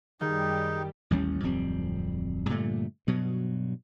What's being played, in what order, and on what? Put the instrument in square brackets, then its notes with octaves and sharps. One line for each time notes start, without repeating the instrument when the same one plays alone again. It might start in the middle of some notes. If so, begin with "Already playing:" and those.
[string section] F#2 G3 G4 [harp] D#3 [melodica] D#4 [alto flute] G#4
[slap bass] A1 D#2 G3 C#4
D1 F2 G3 C4
G2 A#2 D3 A3
G2 B2 F#3